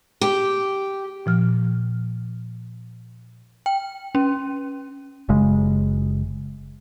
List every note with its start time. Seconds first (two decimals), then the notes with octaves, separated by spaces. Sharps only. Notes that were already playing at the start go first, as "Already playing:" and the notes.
0.21 G4
1.26 A#2 F3 F6
3.66 G5
4.15 C#4
5.29 F#1 C#3 G#3